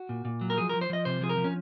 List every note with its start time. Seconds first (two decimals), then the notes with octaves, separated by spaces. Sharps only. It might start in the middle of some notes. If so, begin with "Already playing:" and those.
Already playing: F#4
0.09 A#2
0.25 A#2
0.41 F#3
0.50 A#4
0.57 F3 G#4
0.69 A#4
0.73 F3
0.81 C5
0.90 F3 D#5
1.05 C3 C5
1.21 F3 G#4
1.29 A#4
1.37 F3
1.44 C#4